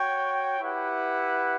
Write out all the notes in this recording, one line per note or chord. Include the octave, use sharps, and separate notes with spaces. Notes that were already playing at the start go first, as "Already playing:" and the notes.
Already playing: F#4 C#5 G5
E4 G4 B4 F#5